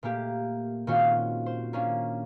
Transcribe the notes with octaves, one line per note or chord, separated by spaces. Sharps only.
A#2 A3 A#3 G4
A#2 D#3 C4 C#4 F4 F#4
C5
A#3 C#4 D4